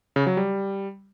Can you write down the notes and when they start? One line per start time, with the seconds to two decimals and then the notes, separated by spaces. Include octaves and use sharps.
0.16 C#3
0.27 F#3
0.37 G3